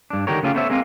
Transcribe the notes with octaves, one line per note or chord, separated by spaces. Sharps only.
G2 D4
D3 D#3 C#4 G4 A#4 C#5
C#3 A3 C#4 F4 G4
A3 B3 C5 C#5 E5
G#3 A#3 C4 E4 F4